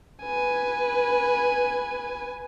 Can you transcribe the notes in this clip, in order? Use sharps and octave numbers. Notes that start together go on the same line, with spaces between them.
B4 G#5